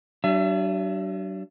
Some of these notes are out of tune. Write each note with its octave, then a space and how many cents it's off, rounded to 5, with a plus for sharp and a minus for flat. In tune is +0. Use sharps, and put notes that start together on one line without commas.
F#3 +45 D4 +0 E5 +35